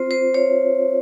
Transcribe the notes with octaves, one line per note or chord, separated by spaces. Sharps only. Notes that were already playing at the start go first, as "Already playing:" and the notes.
Already playing: C4 F4 C5
C5
C#5